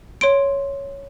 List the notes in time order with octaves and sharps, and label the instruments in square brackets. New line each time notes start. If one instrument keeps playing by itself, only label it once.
[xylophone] C#5 C6 D7